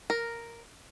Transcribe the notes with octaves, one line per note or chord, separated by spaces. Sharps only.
A#4